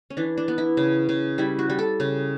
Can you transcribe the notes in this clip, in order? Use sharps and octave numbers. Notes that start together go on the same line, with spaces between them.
C#4
E3 D4
D4
B3
E4
C#3
C#3
G3 E4
F#4
G3
A4
C#3